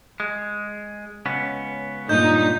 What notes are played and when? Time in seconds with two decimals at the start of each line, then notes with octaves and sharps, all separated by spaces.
0.20 G#3
1.26 C#2 B3 C#4
2.09 G2 A#2 D#4 D#5 G6